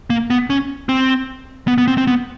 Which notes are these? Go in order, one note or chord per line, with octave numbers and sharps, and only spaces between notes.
A#3
B3
C#4
C4
B3
B3
C4
C4
B3